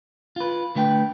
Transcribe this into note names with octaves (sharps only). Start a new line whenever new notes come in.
F4 B4
D3 A3 B4 G5